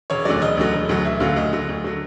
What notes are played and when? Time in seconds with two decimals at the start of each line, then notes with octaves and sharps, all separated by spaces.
0.10 E1 C#5
0.25 D2 D3 F#3 D5
0.42 E1 D#5
0.57 D2 D3 F#3
0.74 E1
0.89 D2 D3 F#3
1.05 E1 E5
1.20 D2 D3 F#3 F5
1.36 D2 D#5
1.53 D3 F#3
1.69 D2
1.84 D3 F#3